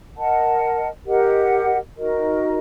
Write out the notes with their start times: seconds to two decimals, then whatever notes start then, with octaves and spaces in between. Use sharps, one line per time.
0.17 A#4 D#5 F#5 A5
1.06 G4 A#4 D#5 F#5
1.96 D#4 F#4 A#4 D#5